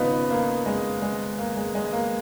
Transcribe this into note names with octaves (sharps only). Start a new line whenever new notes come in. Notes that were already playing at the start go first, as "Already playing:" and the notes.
Already playing: G#1 C#3 B3 D#4 F4
A#3
G#3
G#3
A#3
G#3
G#3
A#3